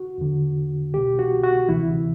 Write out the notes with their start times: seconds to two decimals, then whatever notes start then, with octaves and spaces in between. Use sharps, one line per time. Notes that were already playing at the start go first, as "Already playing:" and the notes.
Already playing: F#4
0.18 E2 D3
0.93 C2 B2 G4
1.19 F#4
1.44 F#4
1.68 D2 C3 E3 E4